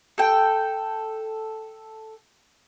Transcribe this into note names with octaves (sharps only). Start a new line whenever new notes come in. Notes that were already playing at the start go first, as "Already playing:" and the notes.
A4 G5